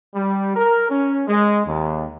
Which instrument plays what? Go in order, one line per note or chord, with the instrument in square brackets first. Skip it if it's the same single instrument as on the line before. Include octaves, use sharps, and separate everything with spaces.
[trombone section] G3
A#4
C#4
G#3
D#2